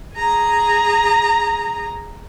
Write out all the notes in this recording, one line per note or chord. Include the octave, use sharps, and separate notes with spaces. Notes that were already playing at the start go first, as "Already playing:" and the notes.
G#4 A#5